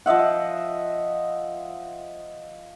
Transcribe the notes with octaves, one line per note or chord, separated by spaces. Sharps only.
F3 D#5 E5 F#5